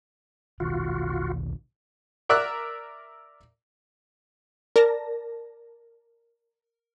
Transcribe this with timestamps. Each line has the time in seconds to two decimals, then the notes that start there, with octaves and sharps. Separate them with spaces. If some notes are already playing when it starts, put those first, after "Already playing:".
0.60 E1 B1 D#3 F4 F#4
2.29 A#4 D5 E5 E6 F#6
4.76 A#4 D5 A5 A#6